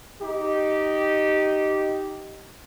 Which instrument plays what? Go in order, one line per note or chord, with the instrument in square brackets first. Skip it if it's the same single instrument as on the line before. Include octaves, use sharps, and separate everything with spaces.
[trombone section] D#4 G4